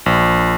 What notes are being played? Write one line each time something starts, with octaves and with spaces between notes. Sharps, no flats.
A#1